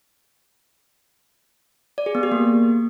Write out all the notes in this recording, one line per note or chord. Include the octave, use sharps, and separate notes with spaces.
D5
G#4
B3
G4
A#3